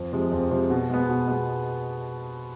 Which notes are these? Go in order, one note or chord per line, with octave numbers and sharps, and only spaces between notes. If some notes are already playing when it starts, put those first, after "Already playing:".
Already playing: F2
C3 F3 G#3
F2
C3 F3 G#3
B2
G#3 B3
B2
G#3 B3